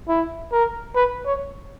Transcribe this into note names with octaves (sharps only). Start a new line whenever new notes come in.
E4
A#4
B4
C#5